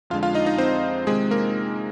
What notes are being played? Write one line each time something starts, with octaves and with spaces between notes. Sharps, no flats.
F2 D3 G#3 D4 F4 F5
F4 F5
D#4 D#5
D#4 D#5
C4 C5
C3 D#3 G#3 C4 G#4
A#3 A#4